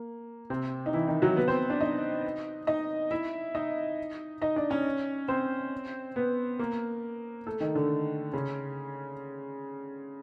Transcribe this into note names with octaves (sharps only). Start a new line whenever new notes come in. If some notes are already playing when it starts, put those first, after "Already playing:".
Already playing: A#3
C3 C4
D#4
E3 E4
D#3 D#4
F#3 F#4
B3 B4
C4 C5
D4 D5
D#4 D#5
D#4 D#5
E4 E5
D#4 D#5
D#4 D#5
D4 D5
C#4 C#5
C4 C5
B3 B4
A#3 A#4
A3 A4
D#3 D#4
D3 D4
C#3 C#4